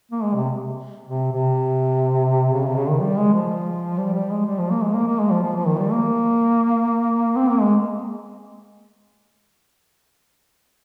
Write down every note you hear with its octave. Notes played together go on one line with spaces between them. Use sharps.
A#3
G#3
C3
C3
C3
C#3
C3
C#3
D#3
G3
G#3
F3
G3
G3
G#3
G3
F3
A#3
G#3
A#3
A#3
G#3
F3
F3
F3
D#3
G3
A#3
C4
A#3
G#3